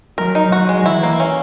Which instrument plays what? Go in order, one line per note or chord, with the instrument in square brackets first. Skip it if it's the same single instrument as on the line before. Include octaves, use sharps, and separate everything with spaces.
[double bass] F#3 [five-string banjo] A#4
[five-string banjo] D#4
[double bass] F#3 [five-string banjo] F#4
[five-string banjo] G#3
[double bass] E3 [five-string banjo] E4
[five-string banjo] A#3
C#4